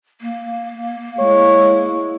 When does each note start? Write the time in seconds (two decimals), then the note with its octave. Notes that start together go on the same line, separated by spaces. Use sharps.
0.21 A#3
1.19 G#3 E4 C#5